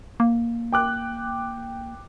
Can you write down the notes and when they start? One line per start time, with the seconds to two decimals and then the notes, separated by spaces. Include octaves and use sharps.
0.20 A#3
0.72 G5 D6 F#6